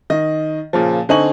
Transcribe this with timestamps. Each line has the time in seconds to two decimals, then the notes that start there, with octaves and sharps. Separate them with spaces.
0.10 D#3 D#5
0.73 A#2 C#3 F3
1.09 D3 C4 D#4 G#5 C#6 F#7